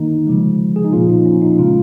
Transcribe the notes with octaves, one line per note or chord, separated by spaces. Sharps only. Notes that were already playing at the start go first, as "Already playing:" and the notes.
Already playing: D#3 A#3 D#4
C#3 F3 G#3
G#4
D#4
A#2 F3 A#3 F4
D#4
C#4
D#4
C#3 G#3 F4